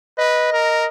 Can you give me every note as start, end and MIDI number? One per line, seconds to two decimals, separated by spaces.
0.18 0.48 71
0.18 0.88 75
0.53 0.87 70